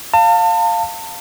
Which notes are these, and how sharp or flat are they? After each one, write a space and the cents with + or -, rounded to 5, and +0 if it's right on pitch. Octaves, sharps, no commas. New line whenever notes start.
F5 +0 A5 +35